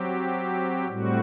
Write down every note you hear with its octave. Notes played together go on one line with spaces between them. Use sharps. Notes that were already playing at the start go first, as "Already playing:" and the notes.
Already playing: F#3 C4 G4
A2 G3 C4 F#4